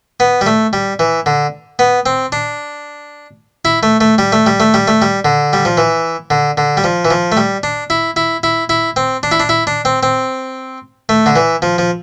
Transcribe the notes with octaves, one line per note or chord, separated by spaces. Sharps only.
B3
G3
A3
G3
E3
D3
B3
C4
D4
E4
A3
A3
G3
A3
G3
A3
G3
A3
G3
D3
G3
F3
E3
D3
D3
G3
F3
E3
F3
A3
G3
D4
E4
E4
E4
E4
C4
D4
E4
D4
E4
D4
C4
C4
A3
D3
E3
F3
F3